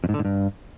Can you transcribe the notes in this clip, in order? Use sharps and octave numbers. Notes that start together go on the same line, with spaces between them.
F2
G#2
D3
G#2
G2